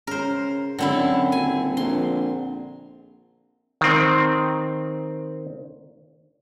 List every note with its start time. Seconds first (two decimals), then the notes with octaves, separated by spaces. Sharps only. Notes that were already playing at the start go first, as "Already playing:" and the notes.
0.07 C#3 A#4 C5
0.79 F#2 D3 C4 E4
1.32 D#1 G#5
1.77 A#1 C6
3.81 D#3 C4